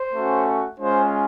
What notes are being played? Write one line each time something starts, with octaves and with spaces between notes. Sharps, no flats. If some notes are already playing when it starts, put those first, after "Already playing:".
Already playing: C5
A3 C#4 F#4
G#3 C#4 F4 C5